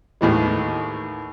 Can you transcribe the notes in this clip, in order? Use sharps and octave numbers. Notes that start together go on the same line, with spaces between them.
D#2 A2 E3 G#3